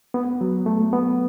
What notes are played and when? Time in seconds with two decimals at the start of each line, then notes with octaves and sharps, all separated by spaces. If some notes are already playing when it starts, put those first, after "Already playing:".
0.14 B3
0.41 F#3
0.66 A3
0.93 B3